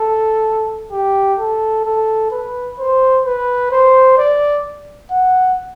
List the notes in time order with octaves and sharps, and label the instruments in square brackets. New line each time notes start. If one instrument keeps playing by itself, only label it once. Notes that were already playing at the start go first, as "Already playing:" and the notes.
Already playing: [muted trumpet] A4
G4
A4
A4
B4
C5
B4
C5
D5
F#5